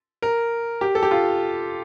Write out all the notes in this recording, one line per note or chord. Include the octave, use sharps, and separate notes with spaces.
A#4
G4
A4
G4
F4